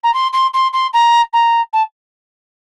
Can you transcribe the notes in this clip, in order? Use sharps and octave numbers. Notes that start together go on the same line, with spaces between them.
A#5
C6
C6
C6
C6
A#5
A#5
A5